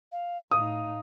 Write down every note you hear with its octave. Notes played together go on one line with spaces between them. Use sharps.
F5
A2 D#4 F5 D#6